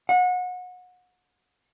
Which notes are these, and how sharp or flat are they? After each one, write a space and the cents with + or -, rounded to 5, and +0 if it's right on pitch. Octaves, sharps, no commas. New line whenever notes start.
F#5 -30